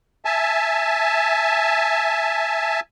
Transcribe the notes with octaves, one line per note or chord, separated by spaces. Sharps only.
E5 G#5 A5